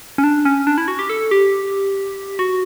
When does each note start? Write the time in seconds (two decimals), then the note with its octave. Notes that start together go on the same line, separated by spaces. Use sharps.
0.18 C#4
0.24 D4
0.45 C#4
0.67 D4
0.78 E4
0.88 F#4
0.99 G4
1.09 A4
1.31 G4
2.39 F#4